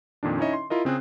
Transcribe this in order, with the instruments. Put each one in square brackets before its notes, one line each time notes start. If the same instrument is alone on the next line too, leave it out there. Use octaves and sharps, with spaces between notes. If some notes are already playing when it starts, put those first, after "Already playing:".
[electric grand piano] F2 A#2 D#3 D4
C#4 D#4 E4 C#5 D#5 E5
C6
E4 F4 A#4 D#5
C#3 C4 G#4 F#6